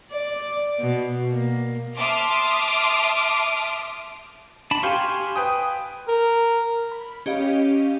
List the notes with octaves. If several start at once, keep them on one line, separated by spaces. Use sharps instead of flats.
D5
B2
A#3
E5 A5 C6 D6 D#6 F6
D4 A5 B5
G4 F5 G#5 C6 C#6
B4 G5 D#6
A#4
B5
C#4 G4 D#5 F5